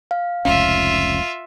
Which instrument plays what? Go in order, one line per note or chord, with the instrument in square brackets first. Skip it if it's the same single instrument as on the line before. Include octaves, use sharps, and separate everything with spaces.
[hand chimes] F5
[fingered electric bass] F1 C#2 C#4 [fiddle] F4 E5 [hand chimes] F5